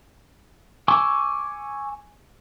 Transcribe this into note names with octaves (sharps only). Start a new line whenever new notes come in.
G#5 C#6 D6 E6